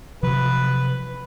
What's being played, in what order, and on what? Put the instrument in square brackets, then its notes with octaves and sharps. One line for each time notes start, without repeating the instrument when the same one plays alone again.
[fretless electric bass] C3 F3 F#3 [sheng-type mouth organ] B4